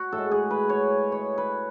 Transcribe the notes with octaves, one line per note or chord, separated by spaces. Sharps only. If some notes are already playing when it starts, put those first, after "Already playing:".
Already playing: F#4
A2 A4
G#3
G#4
B4
C#5
C#5
B4